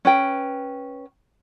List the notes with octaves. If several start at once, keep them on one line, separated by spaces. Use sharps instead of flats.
C#4 B4 G5